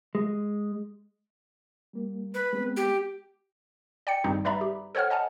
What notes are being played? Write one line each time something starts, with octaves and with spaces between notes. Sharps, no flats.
G#3
G3 A#3
B4
G#3 B3 C4
G4
D5 G5 C#7
G#1 G2 G3 C4 D#4
G3 B4 D5 E5 A#5 B5
G4
A4 C5 C#5 F#5 F6
D#5 F#5 G#5 A5